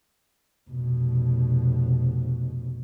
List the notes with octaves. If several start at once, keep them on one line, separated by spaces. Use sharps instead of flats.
F1 B2